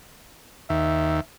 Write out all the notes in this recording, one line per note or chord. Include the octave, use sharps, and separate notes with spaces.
D#2 E5